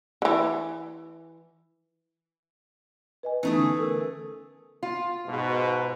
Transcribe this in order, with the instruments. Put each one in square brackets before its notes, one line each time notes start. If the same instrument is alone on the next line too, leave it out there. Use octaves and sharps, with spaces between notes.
[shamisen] D3 E3
[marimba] B4 D#5 G#5
[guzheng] E3 A3 G#4 [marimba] B3 C#4 D#4
[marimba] D3
A4 A#4 E6
[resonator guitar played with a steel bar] F4
[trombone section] G#2 B2